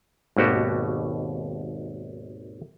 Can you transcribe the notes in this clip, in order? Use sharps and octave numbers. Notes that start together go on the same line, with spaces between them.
G#1 D#2 B2 F#4 G4